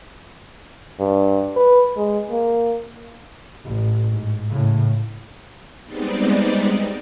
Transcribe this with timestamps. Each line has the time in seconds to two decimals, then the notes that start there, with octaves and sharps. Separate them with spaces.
1.00 G2
1.56 B4
1.97 G#3
2.31 A#3
3.65 A1
4.11 G#2
4.50 A2 C#3
5.85 G3 G#3 B3 C4 D#4 D5